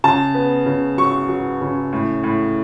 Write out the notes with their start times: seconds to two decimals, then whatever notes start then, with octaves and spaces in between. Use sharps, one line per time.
0.04 C#3 A5
0.35 B3
0.66 C#3
0.97 F#3 C#6
1.29 F#3
1.61 C#3
1.92 A2
2.24 A2